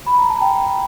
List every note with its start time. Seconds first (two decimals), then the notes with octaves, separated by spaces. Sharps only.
0.06 B5
0.18 A#5
0.30 A5
0.41 G5